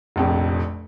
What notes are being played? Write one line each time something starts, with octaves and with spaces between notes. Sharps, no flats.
F1 A#1 F2